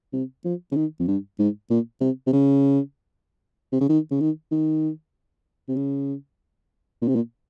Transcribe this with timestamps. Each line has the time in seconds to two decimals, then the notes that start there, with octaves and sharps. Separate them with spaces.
0.13 C3
0.45 F3
0.71 C#3
0.76 D#3
0.99 F2
1.08 G2
1.39 G#2
1.70 A#2
2.01 C3
2.27 C3
2.32 C#3
3.72 C3
3.81 C#3
3.89 D#3
4.11 C#3
4.20 D#3
4.51 D#3
5.68 C3
5.76 C#3
7.02 A#2
7.08 C3
7.15 A#2